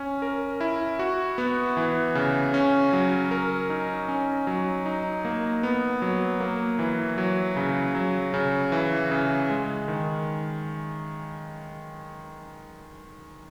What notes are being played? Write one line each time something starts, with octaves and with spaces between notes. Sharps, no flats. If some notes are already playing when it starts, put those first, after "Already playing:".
Already playing: C#4
A#4
E4
F#4
B3
E3
C#3
C#4
F#3
A#4
D#4
C#4
F#3
D#4
A#3
B3
F#3
A#3
E3
F#3
C#3
F#3
C#3
E3
C#3
G#3
D#3